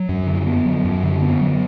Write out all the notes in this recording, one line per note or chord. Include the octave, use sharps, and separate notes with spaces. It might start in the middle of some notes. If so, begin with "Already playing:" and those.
Already playing: F#3
F#2
D3
B3
F#3
F#2
D3
B3
F#3